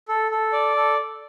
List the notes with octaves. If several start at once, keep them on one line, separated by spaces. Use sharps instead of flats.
A4
A4
D5
A4